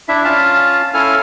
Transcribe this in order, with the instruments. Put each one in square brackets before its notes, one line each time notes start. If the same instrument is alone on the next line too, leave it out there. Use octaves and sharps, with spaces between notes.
[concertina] D4 E4 E5
C#4 F4 F5 A5
C#4 E4 A4 F5 G#5 F6